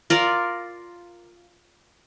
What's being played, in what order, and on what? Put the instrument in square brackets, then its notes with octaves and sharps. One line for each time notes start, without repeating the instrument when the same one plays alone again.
[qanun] F4 A#4 D5